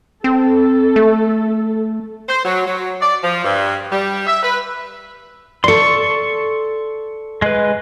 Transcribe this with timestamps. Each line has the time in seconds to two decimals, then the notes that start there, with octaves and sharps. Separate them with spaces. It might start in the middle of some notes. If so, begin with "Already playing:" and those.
0.24 C4 A4
0.96 A3
2.29 C5
2.44 F#3
2.66 F#3
3.01 D5
3.23 F3
3.44 G2
3.92 G3
4.27 E5
4.43 B4
5.64 A4 D5 C6 C#6
7.42 G#3 B4